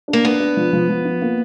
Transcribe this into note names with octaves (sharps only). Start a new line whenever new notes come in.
D4
A#3
B3 D4
D4
F3
F3
F3
F4
A#3